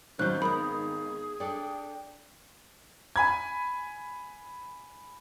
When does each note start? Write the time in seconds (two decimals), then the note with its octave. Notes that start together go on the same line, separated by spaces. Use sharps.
0.19 G#1 D#2 D#3 F#3 C#4 C5 F#6 G6
0.42 B3 G#4 A#4 B5 D#6
1.40 D4 A4 D5 G5
3.16 G#5 B5 G#6